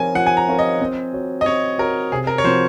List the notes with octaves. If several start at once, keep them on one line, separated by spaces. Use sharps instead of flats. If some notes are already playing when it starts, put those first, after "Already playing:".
Already playing: F3 C4 F4 A#4 C#5 G#5
F3 F#5
G#5
A#5
C4 F4 A#4 C#5
D#5
C4
F#4 C#5
D#5
C4 C#5
F#4 A#4 C#5
C3 G#4
A#4
C#5
F3 C4 F#4 C5